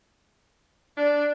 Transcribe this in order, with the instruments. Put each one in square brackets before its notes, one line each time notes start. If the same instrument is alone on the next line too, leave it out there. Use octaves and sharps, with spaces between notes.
[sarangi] D4